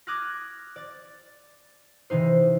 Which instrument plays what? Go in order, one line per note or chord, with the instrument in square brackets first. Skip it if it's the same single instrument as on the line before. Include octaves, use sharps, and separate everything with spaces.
[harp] D6 D#6 F6 F#6 G#6 A#6
D5 A6
C3 E3 D#4 C5